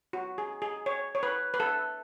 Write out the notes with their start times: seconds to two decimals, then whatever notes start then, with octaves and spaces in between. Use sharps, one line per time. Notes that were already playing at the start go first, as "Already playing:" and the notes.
0.13 F#4
0.38 G#4
0.62 G#4
0.86 C#5
1.15 C#5
1.23 B4
1.54 B4
1.60 A4